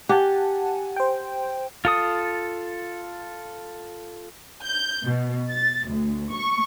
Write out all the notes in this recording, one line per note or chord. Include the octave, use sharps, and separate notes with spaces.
G4 F#5 G#5 A5
C5 G5
F4 A4 D#6
G6
B2
A6
D2
C#6